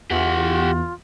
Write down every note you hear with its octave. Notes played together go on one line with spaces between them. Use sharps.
E2 F4 G4 F#5